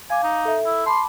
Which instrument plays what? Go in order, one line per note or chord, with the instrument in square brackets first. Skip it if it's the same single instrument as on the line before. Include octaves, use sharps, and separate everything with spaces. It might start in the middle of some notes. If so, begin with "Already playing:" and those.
[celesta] F5 D6 [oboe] G#5
[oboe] D#4
[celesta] A4 E5
[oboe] E4
[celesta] A5 B5 D6 [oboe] C6